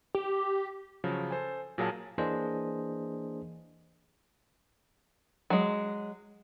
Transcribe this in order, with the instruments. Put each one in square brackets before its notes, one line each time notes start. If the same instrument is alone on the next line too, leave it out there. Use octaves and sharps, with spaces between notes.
[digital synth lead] G4
[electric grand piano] C#3 F3 F#3
A4 C5 G#5
A#2 F#3 G#4 A#4 F5 A5
[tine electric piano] E3 A#3 D4 G#4 C5 D#5
[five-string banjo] F#3 G#3